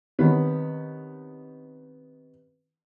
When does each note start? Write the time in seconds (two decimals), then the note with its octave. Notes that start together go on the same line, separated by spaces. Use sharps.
0.19 C3 D#3 B3 C#4